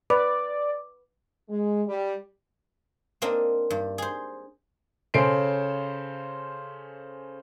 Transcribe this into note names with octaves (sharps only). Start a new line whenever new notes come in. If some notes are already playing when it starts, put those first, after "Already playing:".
B4 D5 D6
G#3
G3
A#3 C4 D4 A#4 D#5
G2
G#4 C5
C#3 C#4 A4 C5 C7 D7